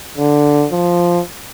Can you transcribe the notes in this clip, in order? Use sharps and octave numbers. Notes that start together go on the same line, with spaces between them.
D3
F3